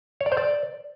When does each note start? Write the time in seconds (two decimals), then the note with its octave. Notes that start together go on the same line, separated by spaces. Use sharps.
0.21 C#5
0.26 D5
0.32 C5
0.37 D5